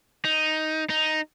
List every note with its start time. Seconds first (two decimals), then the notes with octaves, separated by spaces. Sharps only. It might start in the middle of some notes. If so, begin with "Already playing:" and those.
0.25 D#4
0.90 D#4